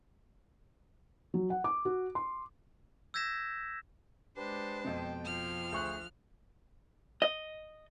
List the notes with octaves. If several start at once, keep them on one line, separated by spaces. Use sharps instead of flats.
F#3
F#5
D6
F#4
C6
E6 G6 G#6 A#6 B6 E7
G#3 D4 G4 B4 C5 A5
F2 B2 G5
F3 F6
D2 G#4 C5 C#6 F#6
D#5